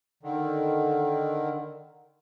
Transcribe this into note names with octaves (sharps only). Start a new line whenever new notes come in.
D3 D#3